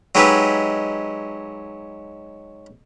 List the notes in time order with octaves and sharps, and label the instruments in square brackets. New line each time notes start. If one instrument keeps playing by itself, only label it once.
[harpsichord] F#3 G#3 D#4 G4 B4 E5